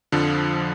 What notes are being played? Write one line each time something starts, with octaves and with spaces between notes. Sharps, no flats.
F2 D3 F3